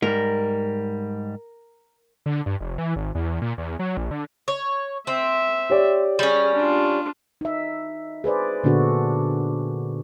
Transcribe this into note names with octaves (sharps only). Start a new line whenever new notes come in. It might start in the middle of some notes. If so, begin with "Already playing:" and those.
G#2 G3 A#4
D3
G2
F1
E3
G#1
E2
A#2
E2
F#3
A#1
D3
C#5
C4 E5
G4 C#5 D5
G3 C#4 G#4
D4 F4
D#4 E5
G#4 B4 C5 D5
A#2 D3 B3 D4 F#4 A4